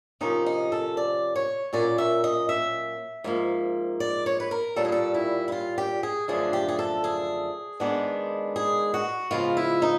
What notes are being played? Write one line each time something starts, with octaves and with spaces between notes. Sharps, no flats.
C3 F3 A#3 C#4 D#4
D#4
A4
D5
C#5
A#2 F#3 A#3 C#4 D5
E5
D#5
E5
G#2 F3 A#3
D5
C#5
B4
A#4
A#2 G3 A#3 C#4 A4
G#4
A4
E4
E4
F4
G4
G#4
F#2 D3 F3 A3 D4 G#4
G4
G#4
A4
G#4
G#2 D#3 G#3 B3 D4
G#4
F#4
C#3 F3 G#3 B3 F4
E4
D#4